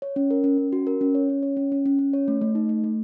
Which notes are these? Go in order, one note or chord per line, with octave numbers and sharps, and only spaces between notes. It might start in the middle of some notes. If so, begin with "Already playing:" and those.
C#5
C#4
A#4
C#4
C#4
F#4
A#4
C#4
C#5
C#4
C#5
C#4
C#4
C#4
C#4
C#5
A3
A3
D#4
A3
A3